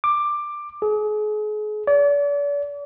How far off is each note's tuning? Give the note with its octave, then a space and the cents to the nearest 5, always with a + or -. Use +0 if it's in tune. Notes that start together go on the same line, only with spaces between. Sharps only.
D6 +10
G#4 +35
D5 -40